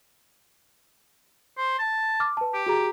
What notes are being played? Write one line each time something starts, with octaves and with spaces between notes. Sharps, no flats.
C5
A5
D6 F6
B4 A5
G4
F#4 G#4 A#5